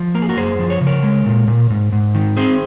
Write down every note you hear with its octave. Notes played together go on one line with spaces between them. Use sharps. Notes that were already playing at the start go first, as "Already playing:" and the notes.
Already playing: F3
A#3 A#4
G#4
F#4 A#4
F#2 G#4 C5
F3
C#5
C#3
A#4 C#5
G#3
A#2
A#2
G#2
G#2
D#3
C4 G#4 C5